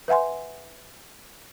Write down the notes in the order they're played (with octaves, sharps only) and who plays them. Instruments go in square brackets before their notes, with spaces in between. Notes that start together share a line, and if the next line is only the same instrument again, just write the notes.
[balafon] B4 E5 F#5 G#5 C6